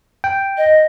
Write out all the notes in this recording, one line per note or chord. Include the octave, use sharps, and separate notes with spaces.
G5
D#5